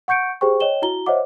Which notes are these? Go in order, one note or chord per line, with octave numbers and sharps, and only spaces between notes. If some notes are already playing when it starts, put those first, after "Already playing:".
F#5 C#6 G6 C#7 D7
G4 G#4 C5 G5 C#6
C#5 D#5 G5 E7 G7
E4 F#4 A#5 G7
C5 C#5 D#5 E5 F#5 D6